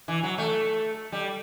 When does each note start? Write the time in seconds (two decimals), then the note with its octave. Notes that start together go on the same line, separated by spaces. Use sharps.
0.08 E3
0.23 F#3
0.38 A3
1.12 G3